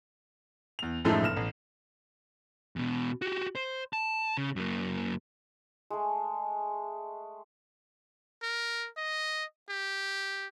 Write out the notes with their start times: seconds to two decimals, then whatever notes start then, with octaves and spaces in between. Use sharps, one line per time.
0.79 E2 F7
1.05 F#2 A2 F3 G#3 A3 D#4
1.23 G1 F6 E7
1.37 A1
2.76 E2 B2
3.22 F#4 G4
3.55 C5
3.93 A5
4.37 C#3
4.56 F#2 A#3
5.90 G#3 A3
8.43 A#4
8.97 D#5
9.70 G4